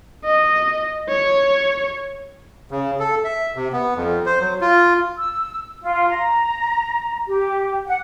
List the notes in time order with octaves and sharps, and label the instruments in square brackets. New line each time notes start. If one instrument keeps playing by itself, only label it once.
[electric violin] D#5
C#5
[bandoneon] C#3
A4
E5
C3
B3
F2
C5
F#3
F4
[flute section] E6
F4
A#5
G4
F#5